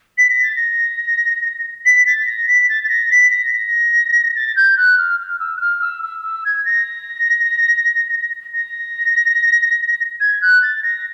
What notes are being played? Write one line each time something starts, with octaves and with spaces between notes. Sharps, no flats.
B6
A#6
A6
A#6
B6
A6
A#6
B6
A6
A6
A#6
B6
A#6
A#6
A6
G6
F#6
F6
F6
E6
F#6
F6
E6
E6
E6
G#6
A#6
A#6
G#6
F#6
A6
A#6